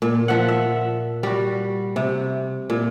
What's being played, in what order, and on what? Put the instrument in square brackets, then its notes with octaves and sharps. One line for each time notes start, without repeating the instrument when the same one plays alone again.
[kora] A#2
F3 E5 F#5
E5
G3 F#4
C3
A#2